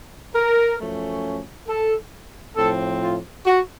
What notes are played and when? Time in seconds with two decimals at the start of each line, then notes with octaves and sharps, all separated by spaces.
0.35 A#4
0.80 F#2 F3 A3 C#4
1.68 A4
2.57 A2 F3 C4 A4
3.02 F4
3.46 F#4